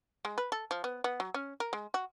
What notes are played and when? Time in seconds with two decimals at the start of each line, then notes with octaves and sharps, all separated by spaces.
0.25 G#3
0.38 B4
0.52 A4
0.71 F3
0.84 B3
1.04 B3
1.20 F#3
1.34 C#4
1.60 A#4
1.73 G#3
1.94 F#4